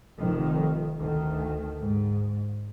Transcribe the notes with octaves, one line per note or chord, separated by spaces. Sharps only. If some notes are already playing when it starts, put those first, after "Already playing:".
F1 F2 D#3
D2 D#3
G#2